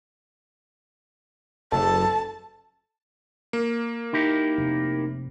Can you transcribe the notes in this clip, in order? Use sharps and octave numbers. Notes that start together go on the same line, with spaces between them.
F#1 A4 A5
A#3
D#4 E4 G4
F1